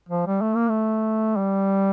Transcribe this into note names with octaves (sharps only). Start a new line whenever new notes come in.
F3
G3
A3
A#3
A3
G3